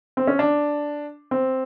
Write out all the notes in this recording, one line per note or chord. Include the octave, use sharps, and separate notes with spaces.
C4
C#4
D4
C4